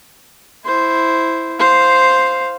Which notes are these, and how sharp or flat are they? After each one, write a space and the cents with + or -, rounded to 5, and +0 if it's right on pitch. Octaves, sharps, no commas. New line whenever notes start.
E4 +0 C5 +0
C5 +0 F5 +0